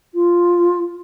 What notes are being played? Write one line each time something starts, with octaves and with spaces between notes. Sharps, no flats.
F4